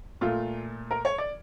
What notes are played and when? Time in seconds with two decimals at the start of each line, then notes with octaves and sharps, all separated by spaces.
0.21 A#2 A3 F4
0.91 A#4
1.05 C#5
1.18 D5